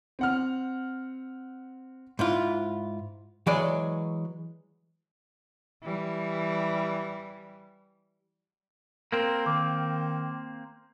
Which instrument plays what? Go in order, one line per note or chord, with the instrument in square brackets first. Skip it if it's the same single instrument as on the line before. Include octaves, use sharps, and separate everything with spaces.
[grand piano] C4 F#5 F6
[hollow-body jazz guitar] G#2 E4 F4
E3 F#3 G#3 C#5 D5
[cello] E3 G3
[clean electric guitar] A#3 C4 [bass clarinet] A#4
[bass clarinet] D#3 [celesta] D6